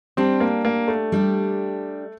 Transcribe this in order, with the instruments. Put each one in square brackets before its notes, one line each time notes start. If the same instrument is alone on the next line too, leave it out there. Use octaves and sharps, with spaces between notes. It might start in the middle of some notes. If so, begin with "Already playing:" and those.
[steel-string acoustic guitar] G3 D4 G4 [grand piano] C4
[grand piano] A#3
A#3
A3
[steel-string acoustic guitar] G3 D4 G4